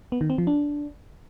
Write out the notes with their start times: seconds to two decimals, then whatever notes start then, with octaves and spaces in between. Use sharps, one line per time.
0.12 B3
0.21 D#3
0.30 C4
0.38 F3
0.47 D4